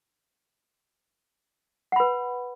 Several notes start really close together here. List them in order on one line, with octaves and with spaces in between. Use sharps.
F#5 B5 B4